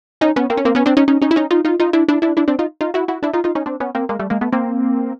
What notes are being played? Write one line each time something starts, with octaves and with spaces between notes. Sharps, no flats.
C#4 D#4
B3 C#4
A#3 C4
C#4
A#3 C4
B3 C#4
C4 D4
C#4 D#4
C#4 D#4
C#4 D#4
E4
C#4 D#4
D#4 F4
D#4 F4
D#4 F4
D4 E4
D4 E4
D4 E4
D4 E4
C4 D4
D#4 F4
D#4 F4
E4 F#4
E4 F#4
D4 E4
D#4 F4
D#4 F4
C#4 D#4
C4 D4
B3 C#4
A#3 C4
G#3 A#3
G3 A3
G#3 A#3
A3 B3
A#3 C4